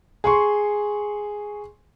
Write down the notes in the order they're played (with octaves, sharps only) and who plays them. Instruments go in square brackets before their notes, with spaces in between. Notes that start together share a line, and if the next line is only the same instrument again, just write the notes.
[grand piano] G#4 C6 C#6